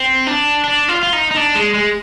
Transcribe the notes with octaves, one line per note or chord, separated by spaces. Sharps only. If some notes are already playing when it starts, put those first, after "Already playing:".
Already playing: C4
D4
D4
F4
F4
D#4
D#4
D4
G#3
G#3